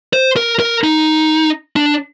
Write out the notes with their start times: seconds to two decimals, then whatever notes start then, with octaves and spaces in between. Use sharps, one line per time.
0.13 C5
0.36 A#4
0.60 A#4
0.84 D#4
1.76 D4